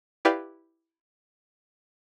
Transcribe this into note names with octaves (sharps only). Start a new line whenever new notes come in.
E4 G4 B4 D5 F5 G5